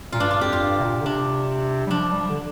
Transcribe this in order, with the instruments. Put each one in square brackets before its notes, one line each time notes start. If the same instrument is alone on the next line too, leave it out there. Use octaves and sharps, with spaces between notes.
[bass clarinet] A#2 [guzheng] F4
[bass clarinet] G2 [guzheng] D4
[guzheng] F4
[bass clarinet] F2 [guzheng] G4
[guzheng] F4
[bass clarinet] G2
C3
A#2
D3
[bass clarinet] C3 [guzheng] D4
[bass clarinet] G3
[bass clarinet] F3 [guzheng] D4
[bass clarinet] G3
F3
D3